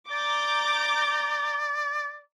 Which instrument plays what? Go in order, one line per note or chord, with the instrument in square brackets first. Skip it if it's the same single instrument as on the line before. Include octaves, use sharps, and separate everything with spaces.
[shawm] D5 [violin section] A#5 D6 G6